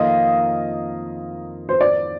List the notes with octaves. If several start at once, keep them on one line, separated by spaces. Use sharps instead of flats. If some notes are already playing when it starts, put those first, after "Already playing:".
Already playing: F2 D#3 A#3 F4 D#5
C5
D5